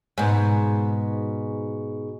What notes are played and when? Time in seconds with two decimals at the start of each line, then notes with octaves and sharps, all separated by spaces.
0.18 G#2 B2